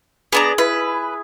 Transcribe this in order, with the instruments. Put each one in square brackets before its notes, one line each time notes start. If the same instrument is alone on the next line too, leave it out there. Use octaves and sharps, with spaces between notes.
[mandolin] B3 D4 A#5 [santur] G#4
[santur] E4 [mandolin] B4